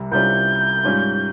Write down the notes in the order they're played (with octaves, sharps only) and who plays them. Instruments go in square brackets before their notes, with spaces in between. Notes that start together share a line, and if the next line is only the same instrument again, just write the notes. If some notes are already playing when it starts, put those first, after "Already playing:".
Already playing: [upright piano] C2 C3 G3
[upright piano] C2 C3 G3 C#4 F4 [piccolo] G6
[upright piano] G#2 G3 C#4 F4